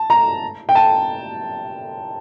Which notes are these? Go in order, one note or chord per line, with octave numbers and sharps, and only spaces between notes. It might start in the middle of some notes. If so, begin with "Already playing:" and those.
Already playing: A5
A#5
G5
A5